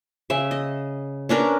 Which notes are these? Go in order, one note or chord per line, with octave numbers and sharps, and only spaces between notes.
C#3 E5
D#5
C#4 D4 A#4 B4